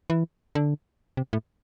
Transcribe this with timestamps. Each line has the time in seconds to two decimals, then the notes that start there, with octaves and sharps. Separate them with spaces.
0.10 E3
0.55 D3
1.17 C3
1.33 A2